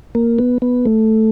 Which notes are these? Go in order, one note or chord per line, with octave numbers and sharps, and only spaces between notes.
A#3
B3
B3
A3